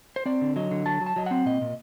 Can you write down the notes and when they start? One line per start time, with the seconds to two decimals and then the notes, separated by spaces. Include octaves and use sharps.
0.16 C5
0.26 C4 D5
0.41 D3
0.56 F#3 D#5
0.71 D3
0.86 F#3 A5
1.01 F#3
1.06 A5
1.16 F#3 D#5
1.26 C4 F#5
1.46 A#2 D#5
1.61 A#2